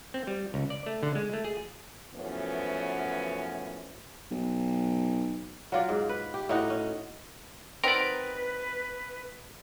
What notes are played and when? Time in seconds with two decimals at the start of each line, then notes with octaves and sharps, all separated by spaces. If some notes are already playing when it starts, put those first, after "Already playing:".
0.14 C4
0.27 G3
0.54 C#2
0.70 D5
0.86 A3
1.03 D3
1.15 G#3
1.33 A3
1.44 G#4
2.14 F#2 E3 F3 A3 B3 C#4
4.31 B1
5.72 F#3 F4 D5
5.89 G#2
6.09 B4
6.34 G4
6.49 A2 D#4 F#4
6.70 C#4
7.84 F#3 C4 D#4 A#4 B4 D5